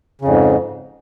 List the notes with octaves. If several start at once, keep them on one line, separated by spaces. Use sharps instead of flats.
F2 G#2 C#3